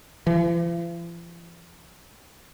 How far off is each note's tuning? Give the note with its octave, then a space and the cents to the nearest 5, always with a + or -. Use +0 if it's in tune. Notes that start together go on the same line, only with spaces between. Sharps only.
F3 -45